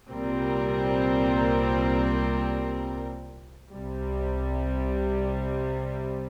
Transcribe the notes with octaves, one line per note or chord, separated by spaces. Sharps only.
C2 A#2 G3 C4 A#4
C2 C3 G3